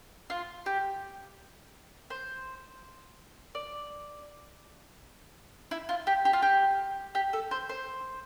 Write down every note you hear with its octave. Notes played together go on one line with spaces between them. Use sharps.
F4
G4
C5
D5
E4
F4
G4
G4
F4
G4
G4
A4
C5
C5